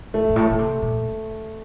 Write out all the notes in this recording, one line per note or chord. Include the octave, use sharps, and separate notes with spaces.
G2 A3
G2
A2
D3
C3
A#2